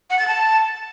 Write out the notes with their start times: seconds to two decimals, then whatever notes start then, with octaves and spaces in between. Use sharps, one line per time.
0.10 F#5
0.19 A6
0.28 A5